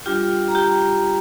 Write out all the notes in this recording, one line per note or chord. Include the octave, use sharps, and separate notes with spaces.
G3 D4 F4 G4 G5
A#5
G4 G5